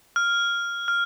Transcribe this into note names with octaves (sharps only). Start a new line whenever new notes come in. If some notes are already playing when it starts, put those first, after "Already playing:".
F6
F6